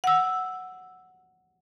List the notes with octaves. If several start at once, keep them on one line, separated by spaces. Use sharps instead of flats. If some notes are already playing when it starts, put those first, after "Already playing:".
F#5 E6